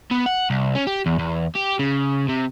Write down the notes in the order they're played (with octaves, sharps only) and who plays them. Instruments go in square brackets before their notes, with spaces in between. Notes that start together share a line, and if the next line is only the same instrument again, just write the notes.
[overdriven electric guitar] B3
F#5
C2
C#4
G4
E2
E2
G4
C#3
C3